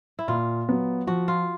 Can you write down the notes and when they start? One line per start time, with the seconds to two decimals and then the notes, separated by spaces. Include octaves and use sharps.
0.19 E4
0.28 A#2 F4
0.69 F#3 B3
1.07 F3 F#4
1.28 F4